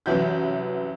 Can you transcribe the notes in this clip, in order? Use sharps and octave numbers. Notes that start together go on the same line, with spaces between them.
C2 F#2 E3 F#3 E5 G6